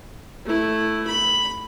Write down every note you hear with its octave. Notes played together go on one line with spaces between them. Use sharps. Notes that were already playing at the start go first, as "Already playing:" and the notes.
A3 E4
B5